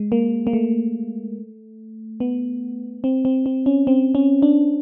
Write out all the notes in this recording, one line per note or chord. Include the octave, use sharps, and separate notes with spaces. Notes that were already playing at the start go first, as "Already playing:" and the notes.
Already playing: G#3
A#3
A#3
A3
B3
C4
C4
C4
C#4
C4
C#4
D4